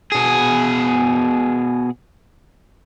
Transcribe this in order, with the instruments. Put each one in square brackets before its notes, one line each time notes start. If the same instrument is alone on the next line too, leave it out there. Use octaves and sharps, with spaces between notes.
[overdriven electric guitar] B2 G#4